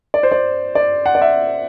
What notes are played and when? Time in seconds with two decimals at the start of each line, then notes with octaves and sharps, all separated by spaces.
0.14 D5
0.23 C5
0.32 D5
0.75 D5
1.06 F#5
1.15 D5
1.21 E5